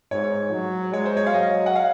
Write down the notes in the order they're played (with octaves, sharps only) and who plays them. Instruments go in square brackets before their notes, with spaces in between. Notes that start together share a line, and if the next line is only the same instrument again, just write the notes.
[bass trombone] G#2 [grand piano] C#5
[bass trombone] F#3
[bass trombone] G#3 [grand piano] C#5
[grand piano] C5
C#5
F5
[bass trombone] F#3 [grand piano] D#5
[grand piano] F#5
F5